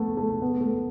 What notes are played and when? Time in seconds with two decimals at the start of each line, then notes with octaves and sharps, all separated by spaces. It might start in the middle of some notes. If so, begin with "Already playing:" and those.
Already playing: A3 B3
0.17 A3
0.42 B3
0.60 A3